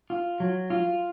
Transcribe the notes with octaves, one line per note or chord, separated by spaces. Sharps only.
F4
F#3
F4